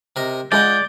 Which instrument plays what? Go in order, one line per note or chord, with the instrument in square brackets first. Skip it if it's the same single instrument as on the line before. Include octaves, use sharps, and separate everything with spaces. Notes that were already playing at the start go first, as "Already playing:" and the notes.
[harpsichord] C3 A#4 D#5
[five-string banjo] G#3 G#4 B5 [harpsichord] F4 D#5 F#5 [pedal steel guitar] D5 [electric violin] G6